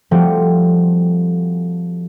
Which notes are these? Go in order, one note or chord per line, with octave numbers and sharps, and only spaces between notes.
F3 G3 A3 C4 F#4 G4